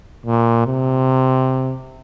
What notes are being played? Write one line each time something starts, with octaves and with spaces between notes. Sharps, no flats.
A#2
C3